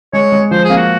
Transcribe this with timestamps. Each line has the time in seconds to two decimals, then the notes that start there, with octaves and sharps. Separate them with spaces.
0.13 G#3 C#5
0.32 G#3
0.51 F3 C5
0.64 G#4
0.70 A#3
0.77 F#4